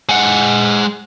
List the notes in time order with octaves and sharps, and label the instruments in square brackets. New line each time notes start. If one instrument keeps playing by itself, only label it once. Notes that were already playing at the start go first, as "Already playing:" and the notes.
[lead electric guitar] G#3 F#5